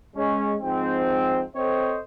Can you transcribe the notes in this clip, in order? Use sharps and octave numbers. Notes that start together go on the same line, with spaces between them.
G#3 C#4
G#2 F3 C4
C4 A4 C5 C#5 D#5